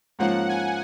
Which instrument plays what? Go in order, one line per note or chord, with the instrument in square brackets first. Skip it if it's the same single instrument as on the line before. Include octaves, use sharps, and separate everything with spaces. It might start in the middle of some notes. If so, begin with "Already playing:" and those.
[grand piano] G#2 F3 A#3 C#4 F4 [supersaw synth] F#5
[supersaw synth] G#5